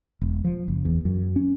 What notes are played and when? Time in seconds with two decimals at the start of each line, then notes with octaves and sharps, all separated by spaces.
0.21 E1
0.45 F3
0.68 F#1
0.85 E2
1.05 F#2
1.36 C#4